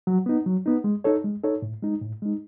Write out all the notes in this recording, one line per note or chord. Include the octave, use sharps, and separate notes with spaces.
F#3
B3 D#4
F#3
B3 D#4
G#3
D#4 A4 C#5
G#3
D#4 A4 C#5
A2
G#3 D#4
A2
G#3 D#4